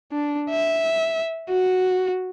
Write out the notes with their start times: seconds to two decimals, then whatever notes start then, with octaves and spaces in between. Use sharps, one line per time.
0.12 D4
0.50 E5
1.49 F#4